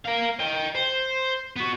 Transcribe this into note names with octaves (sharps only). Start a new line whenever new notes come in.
A#4 F5
D#5 G5
C5
B3 F#4